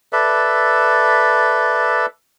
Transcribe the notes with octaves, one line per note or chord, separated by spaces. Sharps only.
A4 B4 D5 E5